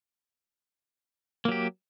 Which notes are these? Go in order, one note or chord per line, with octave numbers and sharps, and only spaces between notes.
F#3 A#3 G4